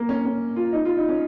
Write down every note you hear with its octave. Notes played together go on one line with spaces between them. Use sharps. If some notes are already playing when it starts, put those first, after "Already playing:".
Already playing: A#3
C#4
C#4
F4
D#4
F4
D#4
C#4